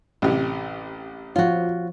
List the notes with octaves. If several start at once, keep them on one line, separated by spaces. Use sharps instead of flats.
A1 C3
F3 F4 F#4 C#5